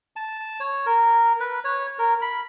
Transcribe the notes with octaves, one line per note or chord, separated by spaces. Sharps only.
A5
C#5
A#4
B4
C#5
A#4
B5